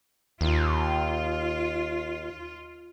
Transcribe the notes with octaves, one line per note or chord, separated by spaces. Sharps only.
D#2 F4